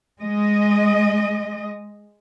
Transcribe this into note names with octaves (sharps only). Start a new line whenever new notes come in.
G#3 D#5